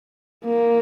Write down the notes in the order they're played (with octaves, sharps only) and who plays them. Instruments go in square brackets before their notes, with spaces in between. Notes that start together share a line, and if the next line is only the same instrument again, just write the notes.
[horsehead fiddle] A#3